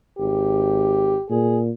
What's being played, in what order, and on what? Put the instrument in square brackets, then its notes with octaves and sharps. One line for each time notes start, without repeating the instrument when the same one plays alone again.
[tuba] G#1 [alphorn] G4
[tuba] A#2 [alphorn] G#4